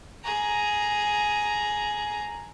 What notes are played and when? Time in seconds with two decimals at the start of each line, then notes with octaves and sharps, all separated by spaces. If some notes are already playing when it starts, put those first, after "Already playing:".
0.24 G#4 A#5